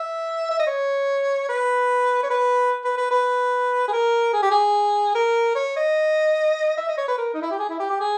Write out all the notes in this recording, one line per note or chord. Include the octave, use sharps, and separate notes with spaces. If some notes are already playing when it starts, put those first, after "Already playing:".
Already playing: E5
E5
D#5
C#5
B4
C#5
B4
B4
B4
B4
G#4
A#4
G#4
G4
G#4
A#4
C#5
D#5
E5
D#5
C#5
B4
A#4
D#4
E4
G4
G#4
E4
G4
G4
G#4